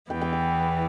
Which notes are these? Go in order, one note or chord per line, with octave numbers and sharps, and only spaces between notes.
E2 E3 B3 G5
G5
G5